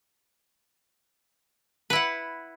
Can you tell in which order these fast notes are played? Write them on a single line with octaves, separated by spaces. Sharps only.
B4 E4 F#5